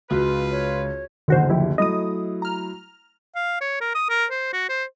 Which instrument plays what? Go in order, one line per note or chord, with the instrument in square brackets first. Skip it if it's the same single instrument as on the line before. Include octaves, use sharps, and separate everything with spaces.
[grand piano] C#2 [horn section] F4 B4 [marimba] F#4
[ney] C#5
[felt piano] F#1 D2 [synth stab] D#3 F#4 C5
[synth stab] F3 E4 G4
[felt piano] F#3 A3 E4 [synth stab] D#5 D#6
[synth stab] A#5 F6
[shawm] F5
C#5
A#4
D#6
A#4
C5
F#4
C5